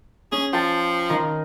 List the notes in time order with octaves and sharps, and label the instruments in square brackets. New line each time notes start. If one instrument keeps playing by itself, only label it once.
[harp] C#4 [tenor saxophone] G#4
[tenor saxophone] F3 [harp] G5 A5
[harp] D#3